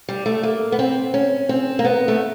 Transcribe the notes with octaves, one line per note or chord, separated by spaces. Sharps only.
G3
A3
A#3
B3
C4
C#4
C4
A#3
B3
A3